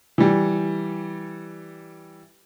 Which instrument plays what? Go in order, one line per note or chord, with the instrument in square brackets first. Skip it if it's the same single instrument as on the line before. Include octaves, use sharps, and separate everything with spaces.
[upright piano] E3 G3